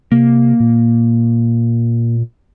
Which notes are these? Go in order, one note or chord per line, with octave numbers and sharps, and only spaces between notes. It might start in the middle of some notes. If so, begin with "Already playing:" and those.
C3 A#3
A#2